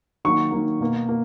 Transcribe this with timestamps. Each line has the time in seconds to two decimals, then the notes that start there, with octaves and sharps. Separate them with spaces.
0.25 D#3 F#3 A#3 C#6
0.52 D#3 F#3 A#3
0.80 B2 A#3
1.09 A#3